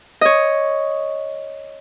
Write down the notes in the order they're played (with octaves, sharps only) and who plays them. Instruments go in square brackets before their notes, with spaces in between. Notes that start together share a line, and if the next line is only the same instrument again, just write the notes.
[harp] C#5 D#5